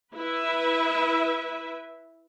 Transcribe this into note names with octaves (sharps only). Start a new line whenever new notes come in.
E4 B4 E5